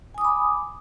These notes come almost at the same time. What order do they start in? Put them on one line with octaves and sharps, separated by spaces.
G#5 D#6 D6 B5